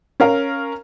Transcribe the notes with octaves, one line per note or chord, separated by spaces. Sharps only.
C#4 A#4 F5